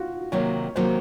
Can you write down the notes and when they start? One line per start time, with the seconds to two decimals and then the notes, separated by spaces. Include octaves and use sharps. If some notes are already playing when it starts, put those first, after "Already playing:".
Already playing: F4 F#4
0.32 C3 D#3 F#3 A#3 C#5
0.76 C3 D#3 F#3 A#3 C5